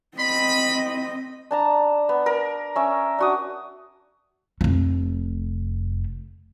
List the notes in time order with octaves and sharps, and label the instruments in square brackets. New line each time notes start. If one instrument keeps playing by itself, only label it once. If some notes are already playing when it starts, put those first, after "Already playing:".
[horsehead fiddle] C4 D#5 [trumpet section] B5
[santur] D4 A5 A#5
B3
A#4
C#4 E5
D4 F#4 D#6
[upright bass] F1 A3